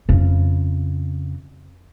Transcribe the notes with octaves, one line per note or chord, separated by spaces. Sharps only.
F2 C#3